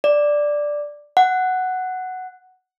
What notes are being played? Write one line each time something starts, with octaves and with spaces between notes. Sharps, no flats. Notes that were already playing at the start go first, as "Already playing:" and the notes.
D5
F#5